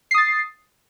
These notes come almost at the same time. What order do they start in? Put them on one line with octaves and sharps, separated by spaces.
C7 D#6 A6